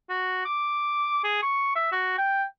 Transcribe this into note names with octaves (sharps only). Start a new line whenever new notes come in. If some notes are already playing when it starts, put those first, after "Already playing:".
F#4
D6
G#4
C#6
E5
F#4
G5